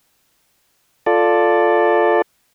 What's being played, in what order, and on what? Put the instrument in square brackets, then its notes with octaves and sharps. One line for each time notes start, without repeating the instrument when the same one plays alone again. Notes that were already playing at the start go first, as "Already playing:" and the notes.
[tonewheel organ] F4 A4 D5